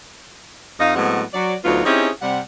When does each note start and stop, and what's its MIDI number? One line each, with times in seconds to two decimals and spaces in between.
0.80 0.93 41
0.80 0.93 63
0.80 0.93 75
0.80 0.93 77
0.95 1.22 45
0.95 1.22 54
0.95 1.22 56
0.95 1.22 59
0.95 1.22 60
0.95 1.22 78
1.34 1.55 54
1.34 1.55 74
1.64 1.84 38
1.64 1.84 54
1.64 1.84 59
1.64 1.84 63
1.64 1.84 65
1.85 2.09 60
1.85 2.09 61
1.85 2.09 63
1.85 2.09 64
1.85 2.09 67
1.85 2.09 68
2.22 2.39 48
2.22 2.39 55
2.22 2.39 78